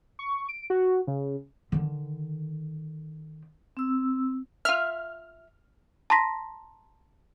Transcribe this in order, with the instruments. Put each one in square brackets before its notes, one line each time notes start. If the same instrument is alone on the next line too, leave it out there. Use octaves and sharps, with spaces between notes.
[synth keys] C#6
D7
F#4
C#3
[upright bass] D3 D#3
[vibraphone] C4 E6
[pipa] F4 E5 [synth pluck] F6
[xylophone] A5 A#5 C6 A#6 B6